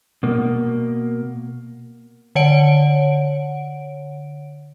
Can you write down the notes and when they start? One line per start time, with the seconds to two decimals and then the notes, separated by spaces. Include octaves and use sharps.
0.23 B2 A#3
2.35 D3 C#5 F#5 D7